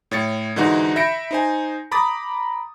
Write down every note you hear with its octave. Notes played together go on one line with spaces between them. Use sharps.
A2 C#5 A6 C#7
G#2 D3 E3 D#4 F#4
E5 B5 G6 A#6 C#7 D7
D#4 C5 G#5
A#5 B5 D6 D#6 A6